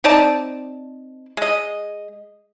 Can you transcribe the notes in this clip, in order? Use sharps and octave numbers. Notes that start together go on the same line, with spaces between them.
C4 D#4 D5 A5
G#3 D#5